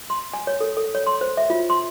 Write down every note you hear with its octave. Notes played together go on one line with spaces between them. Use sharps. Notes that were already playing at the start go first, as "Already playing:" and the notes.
C6
G#5
C#5
A4
A4
C#5
C6
C5
E5
F4
C6